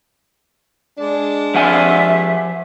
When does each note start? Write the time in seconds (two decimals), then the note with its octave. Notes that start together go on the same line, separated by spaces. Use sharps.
0.97 G#3 D4
1.54 F3 E5 F#5 G#5